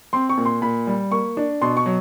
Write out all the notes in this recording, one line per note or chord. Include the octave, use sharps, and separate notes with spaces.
C4 C6
C#6
A#2
C6
A#2 B5
G3
A#3 C#6
D4
B2 C6
C#6
F#3